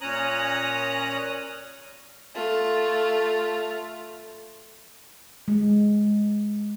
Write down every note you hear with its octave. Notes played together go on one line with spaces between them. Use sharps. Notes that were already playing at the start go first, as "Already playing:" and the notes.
A#2 C#4 C#5 A#5 D#6 F#6
A3 F4
G#3